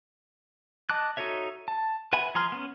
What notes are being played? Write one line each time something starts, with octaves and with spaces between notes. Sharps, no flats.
D#5 A5 D6 F#6
D#4 F#4 A4 C#5 E5
A5
B4 E5 F#5 G#5 B5
F3 G#4 A#5 C6 F6
B3 C#4